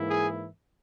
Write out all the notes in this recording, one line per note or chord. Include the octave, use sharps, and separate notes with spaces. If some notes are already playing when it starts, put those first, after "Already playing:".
Already playing: G#2 E3 A#3 E4
G#4